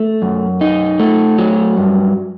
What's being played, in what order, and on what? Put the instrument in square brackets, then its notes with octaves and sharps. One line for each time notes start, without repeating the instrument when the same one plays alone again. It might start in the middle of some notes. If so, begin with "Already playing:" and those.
Already playing: [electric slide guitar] A3
F#2
D#4
A3
F#3
G2